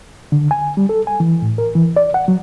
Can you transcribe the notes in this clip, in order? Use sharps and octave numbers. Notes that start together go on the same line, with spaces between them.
D3
G#5
G3
A4
G#5
E3
A2
A#4
E3
D5
F#5
F#3